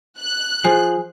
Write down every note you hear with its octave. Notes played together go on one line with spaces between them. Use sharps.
F#6
F3 G#4